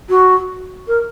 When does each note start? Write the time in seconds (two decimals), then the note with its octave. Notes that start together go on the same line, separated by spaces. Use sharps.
0.09 F#4
0.88 A#4